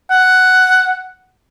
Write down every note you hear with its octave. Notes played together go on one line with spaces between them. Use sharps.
F#5